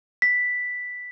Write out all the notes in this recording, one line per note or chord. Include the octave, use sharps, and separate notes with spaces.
B6